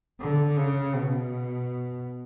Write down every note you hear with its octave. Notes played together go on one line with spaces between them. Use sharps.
D3
C#3
B2